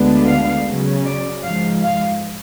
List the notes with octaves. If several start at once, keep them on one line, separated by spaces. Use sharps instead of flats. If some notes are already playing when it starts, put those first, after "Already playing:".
Already playing: D2 D3 G#3 B3 D4
F5
C#3 F#3 C#4
D5
G#2 F3 G#3 F5
F5